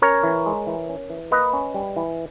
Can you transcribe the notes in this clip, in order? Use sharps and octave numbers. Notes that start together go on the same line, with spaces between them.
C#4 A#4 C#5
E3
G#3
E3
C#4
E3
A#3 B4 D#5
C#4
G3
E3